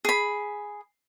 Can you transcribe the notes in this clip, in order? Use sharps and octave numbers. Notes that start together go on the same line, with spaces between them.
G#4 B5